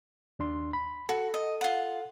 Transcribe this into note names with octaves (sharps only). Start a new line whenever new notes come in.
D#2 D4 C6
B5
F#4 A4
D#5
F4 F#5